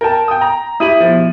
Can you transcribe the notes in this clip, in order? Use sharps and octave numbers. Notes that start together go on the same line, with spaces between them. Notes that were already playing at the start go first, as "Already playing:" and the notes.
A#4 G5 A5
G5 D#6
A#5
E4 G4 E5 D#6 D#7 F#7
B2 F3